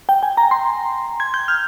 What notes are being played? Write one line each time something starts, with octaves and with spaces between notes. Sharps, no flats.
G5
G#5
A#5
C6
G#6
G6
F6